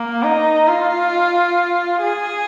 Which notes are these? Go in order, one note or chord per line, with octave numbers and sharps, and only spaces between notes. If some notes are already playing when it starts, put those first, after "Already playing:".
Already playing: A#3
D#4
F4
G#4